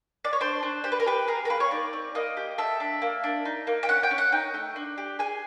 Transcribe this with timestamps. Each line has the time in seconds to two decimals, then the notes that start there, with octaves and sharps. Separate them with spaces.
0.25 D5
0.33 C#5
0.41 D4 C5
0.63 D4
0.84 G4 C5
0.92 B4
1.00 A#4
1.06 G4 B4
1.27 G#4 A#4
1.45 A#4
1.49 A#3 B4
1.60 C#5
1.71 D#4 D5
1.93 C4
2.15 A#3 D#5
2.37 G4
2.58 A4 E5
2.80 D4
3.02 A#3
3.24 D4
3.45 D#4
3.67 A#3
3.83 G5
3.88 C#4 F#5
4.03 G5
4.11 C#4
4.18 F#5
4.32 D#4 G5
4.54 A3
4.76 D4
4.98 G4
5.19 G#4 G#5